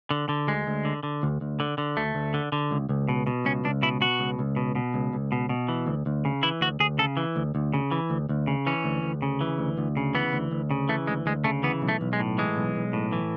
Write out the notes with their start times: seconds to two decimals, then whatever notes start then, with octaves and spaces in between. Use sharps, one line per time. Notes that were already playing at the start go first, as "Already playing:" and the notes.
0.11 D3
0.29 D3
0.47 D2 G#3
0.67 D2
0.85 D3
1.03 D3
1.23 D2
1.41 D2
1.60 D3
1.78 D3
1.97 D2 A3
2.15 D2
2.34 D3
2.52 D3
2.71 C#2
2.89 C#2
3.09 B2
3.27 B2
3.45 C#2 C#4
3.65 C#2 D4
3.83 B2 E4
4.01 B2 F#4
4.19 C#2
4.39 C#2
4.56 B2
4.75 B2
4.94 C#2
5.13 C#2
5.32 B2
5.49 B2
5.69 E3
5.87 D2
6.06 D2
6.25 C#3
6.43 E3 E4
6.61 D2 F#4
6.80 D2 G#4
6.98 C#3 A4
7.17 E3
7.36 D2
7.55 D2
7.74 C#3
7.91 E3
8.10 D2
8.29 D2
8.47 C#3
8.67 E3 C#4
8.84 D2
9.03 D2
9.22 C#3
9.41 E3
9.58 D2
9.78 D2
9.97 C#3
10.15 E3 B3
10.33 D2
10.52 D2
10.71 C#3
10.89 E3 A3
11.07 D2 G#3
11.26 D2 G#3
11.44 C#3 A3
11.63 E3 B3
11.82 B1
11.89 A3
12.01 B1
12.13 G#3
12.20 A2
12.38 E3 G#3
12.56 B1
12.75 B1
12.93 A2
13.12 E3